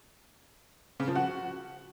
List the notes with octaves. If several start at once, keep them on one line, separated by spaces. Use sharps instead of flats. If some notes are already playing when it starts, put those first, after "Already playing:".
C#3
F3
F#4